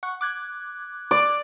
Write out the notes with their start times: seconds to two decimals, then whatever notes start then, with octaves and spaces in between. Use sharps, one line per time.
0.03 F#5 C#6 F#6
0.21 D6 F#6 G#6
1.11 D5